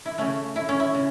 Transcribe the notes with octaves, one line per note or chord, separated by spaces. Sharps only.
E4
C#3 A3 C#4
E4
C#4
E4
C#3